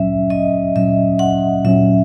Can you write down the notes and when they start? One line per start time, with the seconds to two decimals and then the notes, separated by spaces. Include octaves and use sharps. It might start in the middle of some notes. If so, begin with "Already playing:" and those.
Already playing: A#2 F#3 C#4 E5
0.30 D#5
0.76 A#2 F#3 C#4 E5
1.19 F#5
1.64 A#2 F#3 C#4 E5